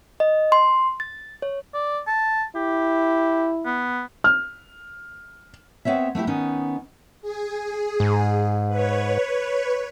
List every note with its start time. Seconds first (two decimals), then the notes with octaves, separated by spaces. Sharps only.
0.20 D#5
0.52 C6
1.00 A6
1.42 C#5
1.74 D5
2.07 A5
2.56 E4 G4
3.65 B3
4.24 F6
5.85 B3 C4 C#5 E5
6.15 A3 B3 E4 G4
6.27 D#3 B3 C#4 D#4
7.22 G#4
8.00 G#2
8.68 B4 C#5